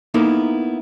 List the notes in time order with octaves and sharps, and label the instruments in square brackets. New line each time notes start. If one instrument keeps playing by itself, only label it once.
[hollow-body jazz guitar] A#3 B3 D#4 E4 A4 A#4